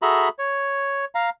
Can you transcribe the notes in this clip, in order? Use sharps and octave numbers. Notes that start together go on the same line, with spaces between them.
F#4 G#4 A4 E5 A#5 B5
C#5
F5 A#5